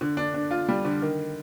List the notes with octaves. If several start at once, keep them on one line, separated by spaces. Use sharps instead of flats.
D3
D4
D4
F4
G3
D3
D#3